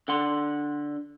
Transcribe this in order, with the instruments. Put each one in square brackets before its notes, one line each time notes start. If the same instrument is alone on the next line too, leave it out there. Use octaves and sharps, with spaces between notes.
[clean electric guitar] D3 F#5 C6